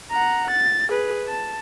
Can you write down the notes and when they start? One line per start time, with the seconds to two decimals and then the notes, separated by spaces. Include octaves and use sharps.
0.12 F#5 A#5
0.51 A6
0.89 G#4 B4
1.28 A5